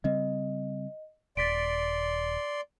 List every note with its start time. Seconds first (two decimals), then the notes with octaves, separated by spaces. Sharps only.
0.04 C#3 G3 C4 D#5
1.37 D#1 D5 C6 A6 B6 D7